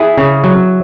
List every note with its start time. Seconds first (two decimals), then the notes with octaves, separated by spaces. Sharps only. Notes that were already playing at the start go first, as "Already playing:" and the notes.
Already playing: E4 G#4
0.18 C#3
0.44 F#3